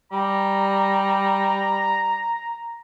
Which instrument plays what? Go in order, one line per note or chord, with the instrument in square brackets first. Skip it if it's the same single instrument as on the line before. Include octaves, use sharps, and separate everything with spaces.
[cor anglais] G3 [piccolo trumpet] A#5